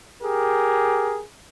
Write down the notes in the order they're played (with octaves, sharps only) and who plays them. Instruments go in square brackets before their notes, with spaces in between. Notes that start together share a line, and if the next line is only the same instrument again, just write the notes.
[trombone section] G4 G#4 A#4